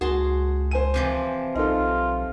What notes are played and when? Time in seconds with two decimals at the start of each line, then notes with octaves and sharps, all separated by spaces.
0.01 C#2 F#4 G#4 A5 C6
0.71 C5 G#5 D#7
0.94 C3 E3 F3
1.55 B1 D#4 F4 A4